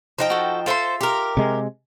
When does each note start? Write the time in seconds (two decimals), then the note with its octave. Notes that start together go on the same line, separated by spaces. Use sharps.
0.18 F3 D#4 G5
0.30 F#4 A4
0.66 F4 A4 C5 E5 C6
1.01 G4 A#4
1.37 C3 G#3